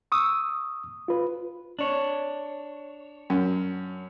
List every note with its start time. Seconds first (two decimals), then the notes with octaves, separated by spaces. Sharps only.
0.12 C#6 D#6 E6
1.08 F4 B4
1.79 D4 C#5
3.30 F#2